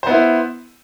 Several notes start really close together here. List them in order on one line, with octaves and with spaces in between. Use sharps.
C5 B3 E4